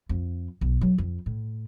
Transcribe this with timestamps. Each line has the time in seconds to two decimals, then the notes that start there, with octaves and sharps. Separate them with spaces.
0.09 F2
0.61 B1
0.81 F#3
0.98 F2
1.26 A2